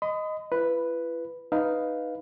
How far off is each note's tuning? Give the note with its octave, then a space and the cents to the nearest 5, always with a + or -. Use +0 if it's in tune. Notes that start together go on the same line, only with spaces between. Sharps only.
D#5 +0 B5 +40
E4 +40 B4 +0
D#4 +0 B4 +0 F5 +0